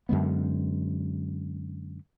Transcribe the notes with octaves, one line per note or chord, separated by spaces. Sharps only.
F#2 D3 G#3 B3